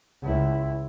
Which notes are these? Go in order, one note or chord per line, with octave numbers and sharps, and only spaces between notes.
C#2 E4